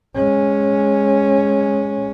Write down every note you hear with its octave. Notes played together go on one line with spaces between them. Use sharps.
G#3 C#4